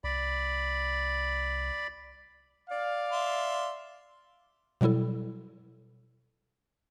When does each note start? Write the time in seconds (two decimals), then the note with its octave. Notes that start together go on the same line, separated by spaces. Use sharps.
0.04 C2 D5 B5
2.70 D5 F5
3.12 E5 C6
4.81 B2 F#3 G3 E4 A4